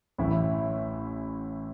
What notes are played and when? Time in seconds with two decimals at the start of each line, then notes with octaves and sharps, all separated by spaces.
0.18 A1 A2 E3 E4